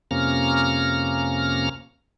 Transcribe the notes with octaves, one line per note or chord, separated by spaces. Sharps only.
F2 C3 A#3 C#4 A#5 F6